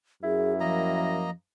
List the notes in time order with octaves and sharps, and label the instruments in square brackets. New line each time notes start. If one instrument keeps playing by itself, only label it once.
[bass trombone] F#2 [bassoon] E4 [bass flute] G#4
[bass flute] F3 [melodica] A#3 D#5 A#5